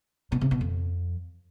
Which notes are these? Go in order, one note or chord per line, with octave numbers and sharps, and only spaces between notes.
B2
C3
B2
F2